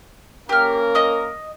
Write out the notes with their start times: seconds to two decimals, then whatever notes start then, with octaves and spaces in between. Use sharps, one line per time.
0.49 A#3 C#4 G4 A#4 F6
0.95 D#5 D#6